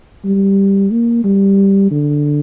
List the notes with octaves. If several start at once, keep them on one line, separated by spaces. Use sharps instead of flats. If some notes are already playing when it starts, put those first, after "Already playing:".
G3
A#3
G3
D3